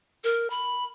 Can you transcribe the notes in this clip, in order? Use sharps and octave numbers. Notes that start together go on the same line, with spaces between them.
A#4
B5